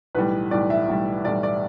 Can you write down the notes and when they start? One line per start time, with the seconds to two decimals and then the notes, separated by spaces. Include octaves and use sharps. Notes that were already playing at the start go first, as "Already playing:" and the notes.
0.15 B1 A2 E3 G3 B4
0.51 B1 A2 E3 G3 D5
0.70 E5
0.88 B1 A2 E3 G3
1.24 B1 A2 E3 G3 D5
1.43 D5